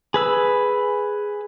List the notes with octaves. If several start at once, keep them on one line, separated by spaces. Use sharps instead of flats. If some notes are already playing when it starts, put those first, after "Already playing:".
G#4 B4 E6